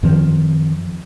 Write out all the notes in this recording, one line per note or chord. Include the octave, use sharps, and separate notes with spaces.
F#2 D#3 F3 C4